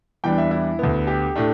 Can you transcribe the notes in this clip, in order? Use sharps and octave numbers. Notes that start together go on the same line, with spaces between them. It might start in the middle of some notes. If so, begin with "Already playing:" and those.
E2 E3 G3 D4 G5
E5
E4
D2 D3 B3
G4
A2 A3 D4